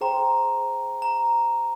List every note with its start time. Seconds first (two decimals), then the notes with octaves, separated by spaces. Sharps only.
0.01 G#4 C5 G5 A#5 C6
1.02 A#5